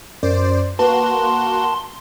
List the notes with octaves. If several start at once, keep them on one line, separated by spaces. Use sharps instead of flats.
F#2 C5 D5
A#3 F#4 B4 A5 C6